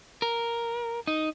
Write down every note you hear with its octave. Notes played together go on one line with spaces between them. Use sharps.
A#4
D#4